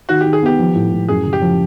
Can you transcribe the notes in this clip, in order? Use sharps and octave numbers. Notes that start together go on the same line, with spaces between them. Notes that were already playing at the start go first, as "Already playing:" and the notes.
D#3 F#4
D#3 G4
G#4
B3 G4
F3
A2
A2
F#2 G#4
C#3
G4
F3